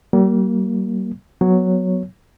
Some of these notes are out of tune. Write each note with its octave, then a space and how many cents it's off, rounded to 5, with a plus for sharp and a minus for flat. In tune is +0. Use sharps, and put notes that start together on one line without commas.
G3 -45 A#3 +0
F#3 +0 B3 +0 C#5 +0